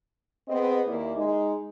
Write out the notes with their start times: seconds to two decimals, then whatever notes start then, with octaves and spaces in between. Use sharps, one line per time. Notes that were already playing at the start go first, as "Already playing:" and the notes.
0.48 B3 C4 G#4 D#5
0.87 D#2 A#3 E4 D5
1.16 G#3 D#4